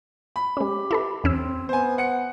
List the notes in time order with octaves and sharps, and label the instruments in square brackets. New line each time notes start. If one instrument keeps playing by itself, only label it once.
[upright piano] B5
[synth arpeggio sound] G#3 C#4 [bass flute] G4
[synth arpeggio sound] E4 A4 B4
[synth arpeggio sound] E2 C#4 E6 [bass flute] C4
[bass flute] B3 [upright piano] C5 G#5
[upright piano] F#5 C#7